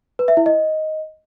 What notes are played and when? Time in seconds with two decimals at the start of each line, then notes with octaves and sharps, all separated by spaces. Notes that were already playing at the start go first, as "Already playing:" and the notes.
0.19 B4
0.28 E5
0.37 E4
0.46 D#5